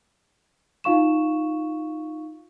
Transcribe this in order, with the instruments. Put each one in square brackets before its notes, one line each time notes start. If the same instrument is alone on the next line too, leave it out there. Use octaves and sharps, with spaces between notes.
[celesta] D#4 F4 F5 C#6 E7